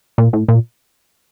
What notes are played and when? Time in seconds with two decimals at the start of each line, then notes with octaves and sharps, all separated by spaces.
0.18 A#2
0.33 A2
0.48 A#2